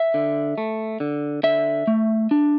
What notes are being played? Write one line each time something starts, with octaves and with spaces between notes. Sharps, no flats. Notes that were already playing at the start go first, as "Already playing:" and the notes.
Already playing: E5
D3
A3
D3
D3 E5
A3
D4